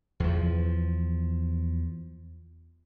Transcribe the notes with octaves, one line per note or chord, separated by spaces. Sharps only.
E2 F3